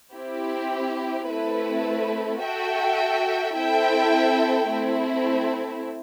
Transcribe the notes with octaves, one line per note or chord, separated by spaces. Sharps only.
C4 E4 G4
A3 C4 E4 B4
F#4 A4 E5 G5
C4 E4 A4 E5 G5
A3 C4 E4